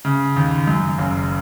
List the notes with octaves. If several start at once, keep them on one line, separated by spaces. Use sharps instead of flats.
C#3
D#2
F#2
F#1